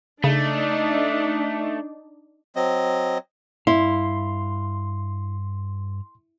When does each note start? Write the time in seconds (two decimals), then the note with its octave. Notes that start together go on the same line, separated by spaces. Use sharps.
0.24 C#3 A3 D4 D#4
2.56 F#3 C4 D#5
3.67 G2 E4 F5 C6